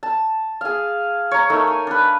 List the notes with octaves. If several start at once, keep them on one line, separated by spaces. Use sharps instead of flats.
A5
G#4 F5
C#5 A#5
A3 D#4 A#4
G#5
D4 B4